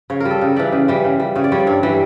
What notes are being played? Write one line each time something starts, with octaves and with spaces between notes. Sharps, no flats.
C#3 C#5
G3 A#4
A4
C#3
E3 G3 D5
C#3
E3 G3
C#3
G3
C#3 C#5
D5
G3 C#5
D5
G2 C#5
E3 G3